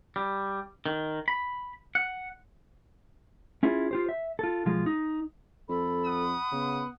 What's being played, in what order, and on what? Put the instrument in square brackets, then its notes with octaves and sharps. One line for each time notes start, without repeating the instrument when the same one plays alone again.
[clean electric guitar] G3
D#3
B5
F#5
C#4 E4 F4 G#4
F4 G4 C5
E5
F4 A4
B1 F3 G#3 F4
D#4
[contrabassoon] F2 [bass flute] A4 [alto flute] B5
[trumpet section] F#5 D#6
[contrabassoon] C#3 [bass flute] B3